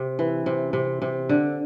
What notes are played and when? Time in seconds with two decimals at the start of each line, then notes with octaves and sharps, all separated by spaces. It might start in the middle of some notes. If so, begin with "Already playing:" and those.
Already playing: C3
0.19 E3
0.46 C3
0.73 C3
1.02 C3
1.29 D3